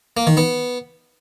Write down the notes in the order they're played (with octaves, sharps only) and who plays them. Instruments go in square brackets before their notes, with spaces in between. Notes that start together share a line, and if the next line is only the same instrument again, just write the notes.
[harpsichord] A#3
D#3
B3